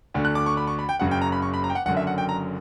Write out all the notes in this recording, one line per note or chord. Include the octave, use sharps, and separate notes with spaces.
D2 D3
F#6
D6
C#6
B5
C#6
B5
G5
F#1 F#2 C#3 F#5
G5
A#5
B5
C#6
B5
A#5
G5
F#5
F#1 F#2 D3 F#5
E5
F#5
G5
A#5